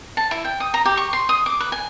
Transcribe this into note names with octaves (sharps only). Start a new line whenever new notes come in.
A5
E4
G5
D#6
A#5
G4
C#6
C6
D#6
D6
B4
G#5